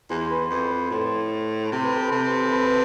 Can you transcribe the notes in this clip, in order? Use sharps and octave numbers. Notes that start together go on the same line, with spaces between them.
E2 C5
B4
F2
C5
A2 C5
C3 C5
B4
A4
C3 B4
A4
B4